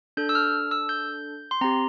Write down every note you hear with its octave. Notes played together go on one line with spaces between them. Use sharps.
D4 A4 G6
E6
F6
E6
G6
C6
C4 G4 A#5